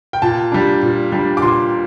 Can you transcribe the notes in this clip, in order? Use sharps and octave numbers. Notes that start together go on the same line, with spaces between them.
G5
A#2 A5
G3 D4
A#2
G3 D4
D6
A#2 C6